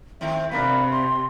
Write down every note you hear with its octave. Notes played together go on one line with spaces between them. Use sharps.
D#3 A3 C4 E5
C3 D4 A#4 B4 F5
G4 C6